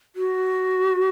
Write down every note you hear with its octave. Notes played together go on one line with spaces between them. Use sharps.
F#4